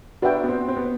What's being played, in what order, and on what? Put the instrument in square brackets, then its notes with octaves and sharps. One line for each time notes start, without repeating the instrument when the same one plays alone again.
[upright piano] D4 [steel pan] F#4 B4 E5 G5
[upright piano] B3
C4
C4
B3